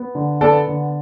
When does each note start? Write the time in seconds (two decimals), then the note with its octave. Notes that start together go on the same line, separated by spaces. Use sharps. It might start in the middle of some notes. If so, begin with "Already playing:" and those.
Already playing: B3
0.15 D3
0.41 B3 A4 D5
0.67 D3